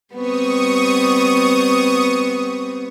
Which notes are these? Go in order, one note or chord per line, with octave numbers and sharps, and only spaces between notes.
G3 B3 C4 C#6 D#6